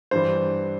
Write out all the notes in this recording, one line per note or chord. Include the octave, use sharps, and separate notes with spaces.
G2 E3 C5